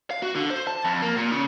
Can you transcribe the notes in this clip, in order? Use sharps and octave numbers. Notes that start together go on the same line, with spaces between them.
F5
F#4
D3
C5
A5
F2
A#3
A#2
C#3